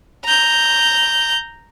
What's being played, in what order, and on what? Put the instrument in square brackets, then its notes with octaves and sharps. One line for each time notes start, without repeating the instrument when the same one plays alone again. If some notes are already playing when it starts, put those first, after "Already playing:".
[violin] A#5 G6